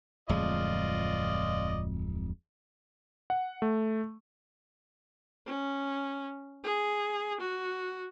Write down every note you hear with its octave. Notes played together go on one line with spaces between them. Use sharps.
D1 F2 G#3 F4 D5 D#5
F#5
A3
C#4
G#4
F#4